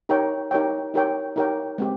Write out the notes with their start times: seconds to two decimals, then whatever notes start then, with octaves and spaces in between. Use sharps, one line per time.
0.09 D#4 G4 A#4 C#5 G5
0.51 D#4 G4 A#4 C#5 G5
0.94 D#4 G4 A#4 C#5 G5
1.36 D#4 G4 A#4 C#5 G5
1.78 G#3 C4 G4